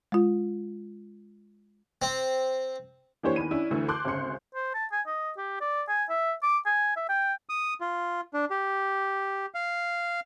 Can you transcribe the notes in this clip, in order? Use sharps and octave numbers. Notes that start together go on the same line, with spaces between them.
G#3 F4
C4
E3 A#3 D4 G4 C5 C#5
E2 D#3 B5 D#7
C#4 D4 E4
D2 D3 E3 A3
A5 C6 D6 F#6 G6
G#1 D2 C#3 C6 C#7
C5
A5
G#5
D#5
G4
D5
G#5
E5
D6
G#5
E5
G5
D#6
F4
D4
G4
F5